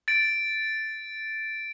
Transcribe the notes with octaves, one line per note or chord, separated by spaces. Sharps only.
A6 D7